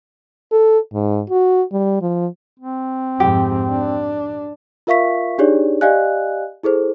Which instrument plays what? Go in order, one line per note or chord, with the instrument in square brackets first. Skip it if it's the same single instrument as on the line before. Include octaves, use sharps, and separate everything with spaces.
[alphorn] A4
G#2
F#4
G3
F3
[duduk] C4
[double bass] F2 G#2 [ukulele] G4
[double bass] D4
[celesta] F4 A#4 E5 F5 C#6 B6
D4 D#4 G4 G#4 C#5 D5
G4 D5 D#5 F5 G#5 F#6
E4 G#4 A4 C5